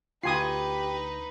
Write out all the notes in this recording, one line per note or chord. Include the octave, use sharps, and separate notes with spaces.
D2 D#4 F4 G4 B4 G#5 D#6 C7